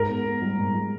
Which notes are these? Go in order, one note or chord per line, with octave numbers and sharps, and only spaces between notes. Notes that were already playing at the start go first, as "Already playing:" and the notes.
Already playing: G#2 A#4
B3
B3
G3
G#2
G3